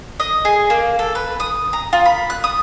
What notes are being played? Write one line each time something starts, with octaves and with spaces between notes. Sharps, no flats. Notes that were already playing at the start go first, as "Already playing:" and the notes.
D#5
G#4
A#3
A4
B4
D#6
A#5
F4
B5
F#6
D#6